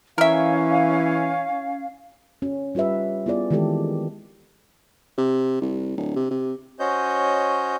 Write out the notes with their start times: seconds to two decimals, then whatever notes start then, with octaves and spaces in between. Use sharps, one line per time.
0.18 E3 C#4 A#4 E5 F5
2.42 C#4
2.75 G3 F4 G4 B4 E5
3.26 B3 E4 F4 G#4 D5
3.51 D#3 E3 G#3 C4 G4 A4
5.18 C3
5.62 C2
5.97 D1
6.16 C3
6.31 C3
6.80 C#4 F#4 C5 C#5 D#5 G6